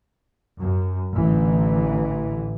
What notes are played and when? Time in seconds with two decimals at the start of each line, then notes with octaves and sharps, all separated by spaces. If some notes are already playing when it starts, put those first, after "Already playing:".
0.59 F#2
1.15 A1 A2 D3 E3